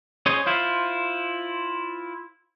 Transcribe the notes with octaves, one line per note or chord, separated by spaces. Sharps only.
C#4 G#4 C5 C#5 D#5
E4 F4 C5